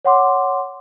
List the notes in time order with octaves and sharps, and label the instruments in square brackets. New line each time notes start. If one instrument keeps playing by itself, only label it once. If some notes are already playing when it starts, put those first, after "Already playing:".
[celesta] C#5 F#5 C6 D6